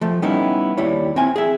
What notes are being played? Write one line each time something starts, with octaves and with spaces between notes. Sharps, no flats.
F3 A3
G3 B3 C#4 D#4 E4
D#2 G3 E4 C#5
C4 E4 G#5
G#4 E5